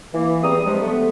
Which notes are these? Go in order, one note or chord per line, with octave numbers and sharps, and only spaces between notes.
E3 A#3
E2 G3 C4 A#5 D#6
G2 C3 F3 G3 G#3
A3 B3